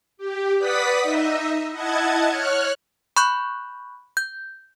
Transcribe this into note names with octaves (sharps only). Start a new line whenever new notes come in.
G4
B4 D5 F#5 D#6 B6
D#4 D#5 E5
E4 D#5 F#5 A5 G#6
C#5 F6 F#6
B5 C#6 F#6 G6
G6